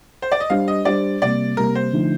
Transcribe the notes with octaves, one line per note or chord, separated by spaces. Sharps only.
C5
D5
D#5
G3 D4 G4 C5 F5
D#5
G3 D4 G4 C5 D5
C3 G3 A#3 D5
C3 G3 A#3 A#4
C5
D3 F3 A3 D#4